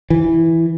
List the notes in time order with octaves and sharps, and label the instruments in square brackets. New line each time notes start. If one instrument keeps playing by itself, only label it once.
[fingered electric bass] E3